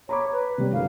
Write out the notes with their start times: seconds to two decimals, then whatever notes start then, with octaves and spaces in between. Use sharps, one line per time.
0.09 C#5 A#5 B5 D6
0.32 B4
0.58 C3 G3
0.73 G1 G3 A#4 F5